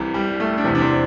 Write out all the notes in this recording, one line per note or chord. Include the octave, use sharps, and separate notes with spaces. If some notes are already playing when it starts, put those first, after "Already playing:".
Already playing: C2 C3 E3
G3
A3
D4
E2 C3 E3 C4
D4
C3 C4